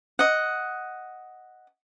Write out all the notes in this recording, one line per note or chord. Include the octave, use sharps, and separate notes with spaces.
D#5 F#5